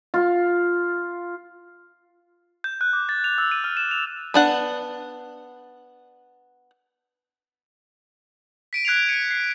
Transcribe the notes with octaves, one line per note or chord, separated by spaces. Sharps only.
F4
G6
F#6
D6
A6
F7
E6
D#7
F6
E7
F7
B3 D4 F#5
B6 D7 D#7
F#6 G#6 C7 D7 F7
D7
C#7 D#7
C7